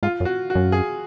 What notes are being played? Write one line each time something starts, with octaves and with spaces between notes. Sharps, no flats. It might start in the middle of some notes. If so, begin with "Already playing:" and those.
G#2 F4
F#2
F#4
F#4
F#2
G#4